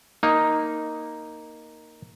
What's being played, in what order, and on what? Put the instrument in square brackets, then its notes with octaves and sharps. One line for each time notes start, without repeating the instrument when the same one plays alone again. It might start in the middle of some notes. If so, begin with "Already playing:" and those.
[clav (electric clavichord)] A#3 D#4